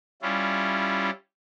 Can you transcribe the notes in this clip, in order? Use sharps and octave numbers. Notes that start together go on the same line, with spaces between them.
G3 C#4 E4 F4